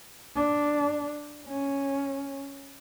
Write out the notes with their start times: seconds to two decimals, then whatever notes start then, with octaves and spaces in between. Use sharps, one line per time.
0.36 D4
1.47 C#4